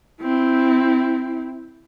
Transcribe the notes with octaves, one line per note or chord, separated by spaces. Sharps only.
C4 E4